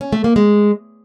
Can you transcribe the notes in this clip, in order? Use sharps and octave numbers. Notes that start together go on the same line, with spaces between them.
C#4
A3
A#3
G#3